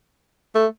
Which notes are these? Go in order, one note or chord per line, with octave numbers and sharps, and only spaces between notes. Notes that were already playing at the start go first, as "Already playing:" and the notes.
A3